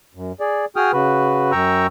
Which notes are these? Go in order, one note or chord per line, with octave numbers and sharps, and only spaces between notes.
F#2
G#4 D5
F#4 G#4 G5 D#6 F6
C#3 F#4 B4
F#2 G5 A#5 C#6 E6